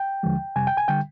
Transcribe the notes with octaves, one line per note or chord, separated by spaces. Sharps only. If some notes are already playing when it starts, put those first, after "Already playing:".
Already playing: G5
D#2 D3 F3 G#3
F2 C3 G3 G#5
G5
G#5
D3 G3 G5